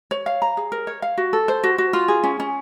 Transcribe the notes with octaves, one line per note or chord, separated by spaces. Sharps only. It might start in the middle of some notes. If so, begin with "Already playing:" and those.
C#5
F5
A#5
G#4
A#4
C#5
F5
F#4
A4
C5
F#4
F#4
F4
G#4
C#4
C#4